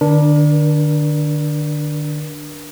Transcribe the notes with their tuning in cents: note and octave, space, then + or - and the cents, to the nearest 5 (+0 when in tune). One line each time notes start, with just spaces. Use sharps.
D3 +40 D4 +0 A#4 +40